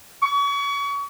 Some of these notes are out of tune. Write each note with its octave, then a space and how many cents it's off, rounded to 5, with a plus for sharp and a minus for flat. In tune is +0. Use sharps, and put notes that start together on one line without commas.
C#6 +35